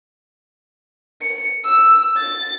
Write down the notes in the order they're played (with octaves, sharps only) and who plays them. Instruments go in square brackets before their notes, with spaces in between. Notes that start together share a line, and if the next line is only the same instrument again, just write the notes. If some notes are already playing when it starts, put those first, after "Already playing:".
[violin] C#7
E6
A6